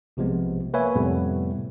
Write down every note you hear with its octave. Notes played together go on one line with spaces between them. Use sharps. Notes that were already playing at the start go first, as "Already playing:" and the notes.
B1 C3 F3 G#3 B3
A#3 B4 C#5 E5 G#5
F2 A2 C3 G3 A3 B3